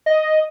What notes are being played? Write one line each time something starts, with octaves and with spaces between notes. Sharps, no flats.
D#5